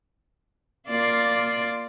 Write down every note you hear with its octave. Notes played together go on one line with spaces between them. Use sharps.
A#3 F4 D5